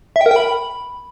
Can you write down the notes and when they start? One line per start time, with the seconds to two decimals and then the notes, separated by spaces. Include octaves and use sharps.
0.16 E5
0.21 G5
0.26 A#4
0.31 G5
0.36 B5